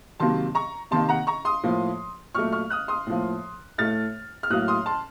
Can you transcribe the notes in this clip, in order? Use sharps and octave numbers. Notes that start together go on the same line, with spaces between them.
C3 D#3 F#3 A#3 A5 C6
A#5 C#6
C3 D#3 A#3 A5 C6
F#5 A#5
A#5 C#6
C6 D#6
A2 F3 A#3
A#2 F#3 A3 C#6 F6
C#6 F6
D#6 F#6
C6 D#6
A2 F3 A#3
A2 A3 F6 A6
F6
A2 F#3 A#3 D#6 F#6
C6 D#6
A5 C6